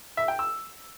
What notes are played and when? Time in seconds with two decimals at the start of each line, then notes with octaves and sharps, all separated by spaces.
0.17 E5
0.28 G5
0.39 E6